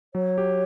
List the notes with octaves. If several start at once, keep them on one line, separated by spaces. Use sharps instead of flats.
F#3 C#5
G4